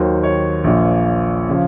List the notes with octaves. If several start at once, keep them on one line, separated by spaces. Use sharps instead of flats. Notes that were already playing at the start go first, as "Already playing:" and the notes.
Already playing: D#2 D#3 F#3 C5
C#5
A#1 A#2 F3
C#3 F3